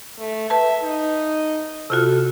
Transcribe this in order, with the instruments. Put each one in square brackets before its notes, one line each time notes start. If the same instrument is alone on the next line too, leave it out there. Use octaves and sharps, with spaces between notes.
[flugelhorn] A3
[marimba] B4 A5 [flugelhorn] E5
[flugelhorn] D#4
[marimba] C3 F4 F#4 [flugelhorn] A4